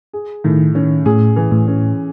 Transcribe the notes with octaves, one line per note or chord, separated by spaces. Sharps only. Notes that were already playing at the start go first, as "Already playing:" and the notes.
G#4
A2 D#3
D#3 C#4
A2 G#4
E3
A2
C#4